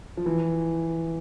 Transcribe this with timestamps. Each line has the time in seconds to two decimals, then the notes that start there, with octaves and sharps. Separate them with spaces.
0.17 F3
0.26 E3